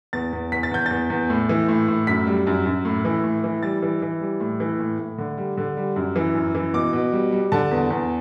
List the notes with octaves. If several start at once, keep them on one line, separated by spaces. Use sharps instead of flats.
E2 A6
E2
E2 B6
A6
E2 G6
E2 A6
E2
A2
E3
A2
A2
F#2 B6
G3
F#2
F#2
A2
E3
A2
E3
G3 A6
E3
E3
G3
A2
E3
A2
A2
D3
G3
D3
G3
F#2
E3
F#2
E3
B2 D6
B2
G3
G3
D3 A5
E2
E2